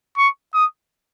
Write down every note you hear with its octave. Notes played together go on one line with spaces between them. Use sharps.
C#6
D#6